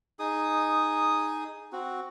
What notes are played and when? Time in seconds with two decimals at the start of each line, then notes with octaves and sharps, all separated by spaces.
0.19 D#4 G#4 D#6
1.73 C4 F#4